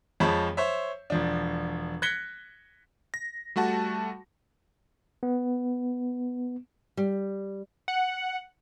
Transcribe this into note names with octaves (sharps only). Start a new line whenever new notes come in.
F2 F3 G#3 C#5 A5 B5
C5 C#5 E5
E1 F3 D4
F#6 G#6 A#6 B6 C#7 G7
A#6
G3 A3 F#4 F#5 A5
B3
G3
F#5